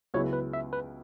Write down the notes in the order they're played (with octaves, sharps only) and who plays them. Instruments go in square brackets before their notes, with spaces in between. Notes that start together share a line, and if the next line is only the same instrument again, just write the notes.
[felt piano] C#2 C#3 F#3 B3 E4 [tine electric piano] C#5
[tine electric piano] B4
E5
B4